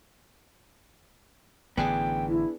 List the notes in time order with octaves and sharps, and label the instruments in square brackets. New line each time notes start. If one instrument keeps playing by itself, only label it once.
[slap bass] A1 D3 E3 [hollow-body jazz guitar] B3 D4 G#4 [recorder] G5
[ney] E4